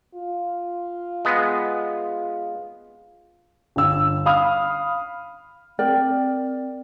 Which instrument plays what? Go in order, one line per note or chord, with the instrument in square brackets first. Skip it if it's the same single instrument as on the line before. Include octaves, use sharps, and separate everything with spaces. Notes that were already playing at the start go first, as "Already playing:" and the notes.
[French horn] F4
[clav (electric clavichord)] G#3 B3
[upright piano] G1 E6
F5 B5 D#6 F6
[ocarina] C4 [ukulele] A#4 D5 G5